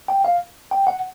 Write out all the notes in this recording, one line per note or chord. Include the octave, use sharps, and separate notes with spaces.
G5
F5
G5
F#5